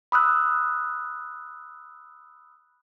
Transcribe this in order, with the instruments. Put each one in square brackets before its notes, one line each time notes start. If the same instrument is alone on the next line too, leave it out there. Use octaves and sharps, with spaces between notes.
[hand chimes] B5 D#6 E6 F#6